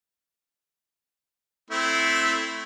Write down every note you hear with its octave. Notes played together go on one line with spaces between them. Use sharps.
A3 C4 E4